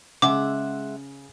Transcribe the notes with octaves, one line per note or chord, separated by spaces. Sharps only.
C#3 G#3 E5 F#5 D6